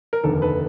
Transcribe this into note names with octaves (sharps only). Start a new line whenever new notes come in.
A#4
F1 D#2 D3 A4
A4 B4